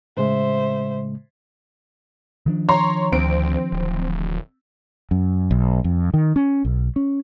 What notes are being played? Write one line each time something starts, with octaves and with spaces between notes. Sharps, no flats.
A2 C#3 G#3 C5 E5
D#3 F3 D4
C#5 A#5 C6
D2 C4 D7
D1
F#2
B1
F2
D#3
C#4
B1
C#4